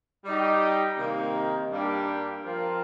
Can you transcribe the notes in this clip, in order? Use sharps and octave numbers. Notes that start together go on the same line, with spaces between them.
G3 D#4 G4
C3 D#3 A#3 D#4
G2 G3 A#3 G4 A#4
F3 C4 F4 A#4